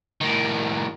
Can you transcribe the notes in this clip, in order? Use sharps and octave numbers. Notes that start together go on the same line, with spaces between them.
A2 D#3